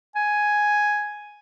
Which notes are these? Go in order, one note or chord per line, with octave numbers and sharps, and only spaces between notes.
G#5